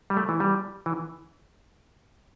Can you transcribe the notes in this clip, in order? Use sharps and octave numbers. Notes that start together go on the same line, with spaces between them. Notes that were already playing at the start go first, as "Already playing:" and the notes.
G3
A3
E3
G3
E3